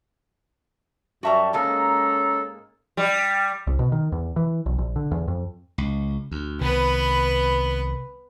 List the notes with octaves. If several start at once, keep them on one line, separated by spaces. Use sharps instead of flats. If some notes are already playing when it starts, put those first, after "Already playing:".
F#2 G3 F#4 E5 A5 A#5
G#2 G#3 A#3 C#4 A4 A#5
G3
C2
B2
D#3
E2
E3
B1
A#1
D3
E2
F2
C#2
D2
C2 D#3 B3 B4